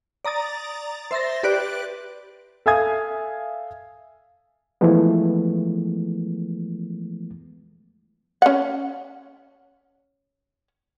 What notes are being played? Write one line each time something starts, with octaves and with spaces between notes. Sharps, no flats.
D5 A#5 D#6 A6
C5 E5 C6 A6 A#6
G4 B4 D5 F#6 D7
A4 E5 F5 G#5 D#6 G#6
E3 F3 G#3 A3 B3
C#4 F#5